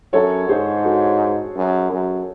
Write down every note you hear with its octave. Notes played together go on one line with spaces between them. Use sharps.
F#2 A4 C#5
G#2 G#4 C5
F#4 A4
F#2
F#2